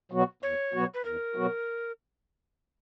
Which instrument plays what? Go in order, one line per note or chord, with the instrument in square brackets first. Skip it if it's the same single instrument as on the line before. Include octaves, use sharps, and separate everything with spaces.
[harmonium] B2 F#3 B3 F#4
[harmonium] E2 [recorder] C#5
[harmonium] B2 F#3 B3 F#4
[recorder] B4
[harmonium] E2 [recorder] A#4
[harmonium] B2 F#3 B3 F#4